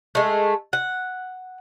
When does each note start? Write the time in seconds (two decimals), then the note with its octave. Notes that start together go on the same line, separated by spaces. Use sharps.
0.15 G#3 A3
0.73 F#5